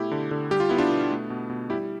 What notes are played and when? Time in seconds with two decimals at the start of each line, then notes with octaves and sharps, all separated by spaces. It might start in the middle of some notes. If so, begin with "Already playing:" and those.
Already playing: B2 A3 E4 G4
0.11 D3
0.31 D3
0.51 G3 G4
0.60 F4
0.69 B3 E4
0.78 D4 F4
0.90 B2
1.11 A3
1.30 B2
1.50 B2
1.70 G3 E4 G4